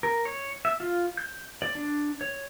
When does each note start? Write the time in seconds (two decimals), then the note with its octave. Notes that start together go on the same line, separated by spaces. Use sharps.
0.03 A#4
0.25 C#5
0.65 E5
0.80 F4
1.17 G6
1.62 D5
1.75 D4
2.21 C#5